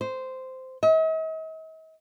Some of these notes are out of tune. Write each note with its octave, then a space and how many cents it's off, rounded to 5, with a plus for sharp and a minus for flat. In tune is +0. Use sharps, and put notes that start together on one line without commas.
C5 -10
D#5 +45